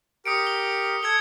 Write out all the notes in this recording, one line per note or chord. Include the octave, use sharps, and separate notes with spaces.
G4 A#4 D#6 C#7 D7
G7
A4 E6 G#6 C#7 G7